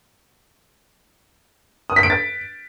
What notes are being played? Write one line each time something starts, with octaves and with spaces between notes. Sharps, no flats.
D#6
B6
D7
A6